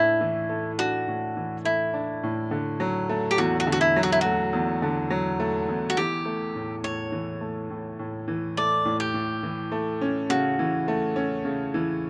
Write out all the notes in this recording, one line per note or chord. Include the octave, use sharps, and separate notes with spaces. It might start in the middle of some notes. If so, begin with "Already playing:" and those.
Already playing: A2 A3 D4 E4
E3
A3
D4 F#4
A2
E3
A3 E4
D4
A2
D3
F#3
A3
G4
E2 F#4
F#4
D3
F#4
E4
F#3
F#4
E4
A3 F#4
E2
D3
F#3
A3
E2
F#4
E3 G4
A3
A2
A2 C#5
E3
A3
A2
A2
E3
A3 D5
A2
G4
A2
E3
A3
C#4
C#3 F#4
E3
A3
C#4
C#3
E3